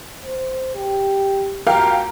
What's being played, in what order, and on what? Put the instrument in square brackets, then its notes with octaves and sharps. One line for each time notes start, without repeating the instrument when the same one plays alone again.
[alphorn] C5
G4
[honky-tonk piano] F2 G4 F5 [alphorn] F#4 [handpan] A#4